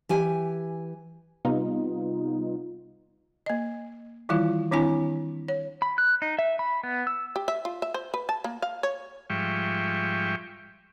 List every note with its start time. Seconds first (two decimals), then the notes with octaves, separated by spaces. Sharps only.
0.09 E3 G4 G#5
1.45 C3 G3 B3 D#4 F4
3.46 A#3 D#5
4.29 D#3 E3 G3 E4 F4
4.72 D#3 C4 D4 E4 G#5
5.48 C#5
5.82 B5
5.98 F#6
6.22 D#4
6.39 E5
6.59 B5
6.84 B3
7.07 E6
7.36 G4
7.48 E5
7.65 F4
7.82 E5
7.94 C5
8.14 B4
8.29 A5
8.44 A#3
8.62 F5
8.83 C#5
9.30 G#2 F3 G3 E5 G5 C#6